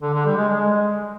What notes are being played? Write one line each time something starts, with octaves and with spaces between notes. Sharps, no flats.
D3
D3
G3
G#3
G#3